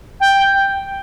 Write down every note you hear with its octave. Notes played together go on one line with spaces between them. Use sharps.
G5